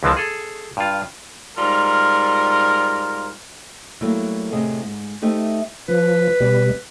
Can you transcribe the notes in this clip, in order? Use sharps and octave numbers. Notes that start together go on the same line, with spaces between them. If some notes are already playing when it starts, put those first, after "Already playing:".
C#2 D3 E3 F3 C4 A5
G#4 A4
G2 F4
G#2 G3 F4 A#4
F#3 G3 A3 A#3 E4
E2 A2 C3 G#4 D#5
G#2
A3 D#4 G4 C5 E5
F3 B4
B2 G3